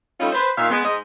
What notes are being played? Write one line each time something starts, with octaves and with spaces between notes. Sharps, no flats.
G3 A3 C#4 D#4 F4
B4 C5
A#2 D#3 E5 F5
G#3 B3
G#2 D#5